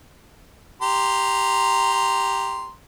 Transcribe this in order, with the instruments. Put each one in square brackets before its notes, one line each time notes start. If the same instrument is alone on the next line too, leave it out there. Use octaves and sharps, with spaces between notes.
[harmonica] G4 A#5 C6